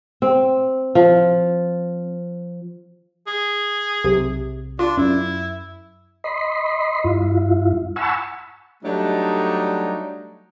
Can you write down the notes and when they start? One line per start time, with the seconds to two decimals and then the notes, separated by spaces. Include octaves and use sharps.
0.22 C4
0.95 F3
3.27 G#4
4.04 B1 C3
4.79 D4 F4
4.97 F#2 E4
6.24 D#5 B5 C6
7.04 G2 E4 F4
7.96 F#5 G#5 A5 B5 C#6 E6
8.84 F#3 G3 A3 D4 D#4